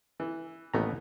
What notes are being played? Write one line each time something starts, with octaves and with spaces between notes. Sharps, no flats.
E3
A1 D#2 A3 B3 A#5